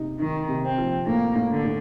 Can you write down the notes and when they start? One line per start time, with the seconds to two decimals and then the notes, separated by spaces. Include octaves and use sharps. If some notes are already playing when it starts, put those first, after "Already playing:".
Already playing: C3 D#4
0.19 D#3 D#4
0.48 C3
0.63 C4
0.78 F3
1.06 A2 A#3
1.35 A2
1.50 D3
1.64 A2